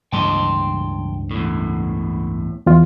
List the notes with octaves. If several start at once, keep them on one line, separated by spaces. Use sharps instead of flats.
C#2 G2 E3 G5 A5 C6
E2 A2
E2 F4